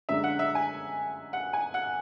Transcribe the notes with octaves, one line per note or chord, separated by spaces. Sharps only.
F#2 D3 G#3 D4 E5
F#5
E5
G#5
F#5
G#5
F#5